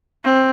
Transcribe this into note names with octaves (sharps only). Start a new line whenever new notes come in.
C4